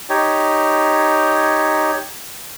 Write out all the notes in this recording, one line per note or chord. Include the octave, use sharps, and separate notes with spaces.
D#4 G4 C#5